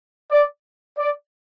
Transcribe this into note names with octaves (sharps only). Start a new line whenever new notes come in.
D5
D5